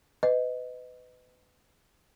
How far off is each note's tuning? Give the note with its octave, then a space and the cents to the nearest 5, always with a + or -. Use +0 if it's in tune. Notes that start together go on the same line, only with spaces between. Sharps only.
B4 +30 D#5 +0